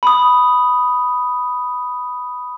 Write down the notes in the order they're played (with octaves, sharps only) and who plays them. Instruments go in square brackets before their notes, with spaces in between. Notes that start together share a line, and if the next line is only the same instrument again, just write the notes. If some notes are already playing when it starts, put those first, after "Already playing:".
[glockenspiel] B5 D#6